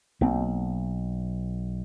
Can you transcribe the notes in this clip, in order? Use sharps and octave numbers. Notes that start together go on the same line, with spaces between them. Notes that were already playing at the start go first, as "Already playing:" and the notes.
B1 A#3 C4